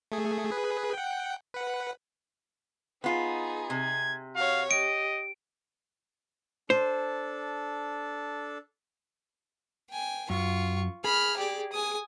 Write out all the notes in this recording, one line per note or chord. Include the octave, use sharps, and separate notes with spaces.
A3 G#4
G#4 B4
F#5 G5
B4 F#5
B3 D#4 F4 G#4
C3 G#6
F#4 C#5 F5
G4 D#5 D7
D4 A4 C5
G5 G#5
F#2 F4 C#6
G#4 B5 F6
G4 D5
G#5 D#6